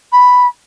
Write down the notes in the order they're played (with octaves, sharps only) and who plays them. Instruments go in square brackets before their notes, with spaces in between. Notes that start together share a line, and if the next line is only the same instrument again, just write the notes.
[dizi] B5